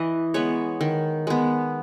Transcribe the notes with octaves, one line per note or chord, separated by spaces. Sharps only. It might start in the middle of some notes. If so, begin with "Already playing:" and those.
Already playing: E3 D#5
G#3 B3 C#5
D#3
G#3 B3